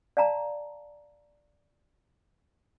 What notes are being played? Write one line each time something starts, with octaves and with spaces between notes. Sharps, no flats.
D5 F5 A5 A#5